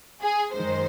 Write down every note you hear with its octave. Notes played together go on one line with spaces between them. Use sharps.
G#4
F#2 D#3 G#3 C5